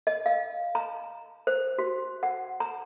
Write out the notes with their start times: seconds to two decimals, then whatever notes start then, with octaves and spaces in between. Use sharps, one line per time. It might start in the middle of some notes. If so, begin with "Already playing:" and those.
0.07 D#5
0.26 F5
0.75 A#5
1.47 C5
1.78 F#4
2.23 F#5
2.60 A#5